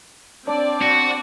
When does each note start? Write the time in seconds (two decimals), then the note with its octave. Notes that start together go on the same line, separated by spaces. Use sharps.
0.47 C4 D4 D5
0.82 F#4